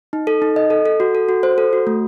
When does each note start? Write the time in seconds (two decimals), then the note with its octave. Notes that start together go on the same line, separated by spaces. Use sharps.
0.13 D#4
0.27 A4
0.42 D#4
0.56 D#5
0.70 A4
0.86 A4
1.00 F#4
1.15 A4
1.29 F#4
1.43 C5
1.58 A4
1.73 F#4
1.87 A3